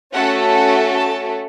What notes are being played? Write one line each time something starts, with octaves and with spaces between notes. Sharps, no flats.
A3 C#4 F#4 A4 F#5
F#5
A5